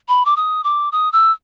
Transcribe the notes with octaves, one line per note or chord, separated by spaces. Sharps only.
B5
D6
D#6
D6
D#6
E6